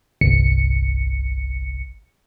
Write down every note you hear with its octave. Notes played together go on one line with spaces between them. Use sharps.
G1 C2 C#7